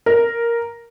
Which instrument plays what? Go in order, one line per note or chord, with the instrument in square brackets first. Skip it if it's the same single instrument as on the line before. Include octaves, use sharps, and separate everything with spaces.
[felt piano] A#4